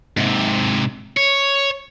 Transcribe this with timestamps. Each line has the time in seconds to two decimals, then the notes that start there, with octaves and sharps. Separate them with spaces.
0.17 G#2 C3
1.17 C#5